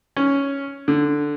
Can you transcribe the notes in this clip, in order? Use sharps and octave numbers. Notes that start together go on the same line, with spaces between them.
C#4
D3